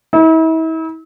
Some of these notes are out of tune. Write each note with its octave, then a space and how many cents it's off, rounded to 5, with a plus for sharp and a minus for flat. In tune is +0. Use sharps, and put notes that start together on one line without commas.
E4 -40